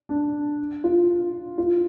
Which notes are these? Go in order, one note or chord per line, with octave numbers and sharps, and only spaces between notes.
D4
F4
F4